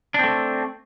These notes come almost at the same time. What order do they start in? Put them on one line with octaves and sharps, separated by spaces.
D4 C4 A3